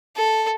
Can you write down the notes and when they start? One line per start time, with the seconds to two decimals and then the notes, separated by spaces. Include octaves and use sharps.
0.16 A4